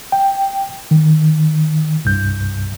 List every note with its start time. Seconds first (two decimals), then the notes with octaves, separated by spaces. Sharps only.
0.12 G5
0.91 D#3
2.05 C2 G2 G6